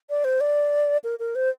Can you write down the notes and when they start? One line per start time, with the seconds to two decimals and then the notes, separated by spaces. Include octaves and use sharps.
0.10 D5
0.24 C5
0.41 D5
1.04 A#4
1.19 A#4
1.35 C5